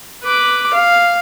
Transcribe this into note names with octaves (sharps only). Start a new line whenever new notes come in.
B4 D6
F5